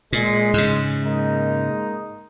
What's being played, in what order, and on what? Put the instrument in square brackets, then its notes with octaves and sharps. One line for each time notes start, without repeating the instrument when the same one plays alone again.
[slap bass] A#2 [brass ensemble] G#3
[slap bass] G#2 C#3
[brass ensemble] G#3 A#3 D#4